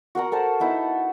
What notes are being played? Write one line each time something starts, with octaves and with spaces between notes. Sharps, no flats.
F#4 A#4 F#5 A#5
A4 A#4 C5 A5
B3 D#4 E4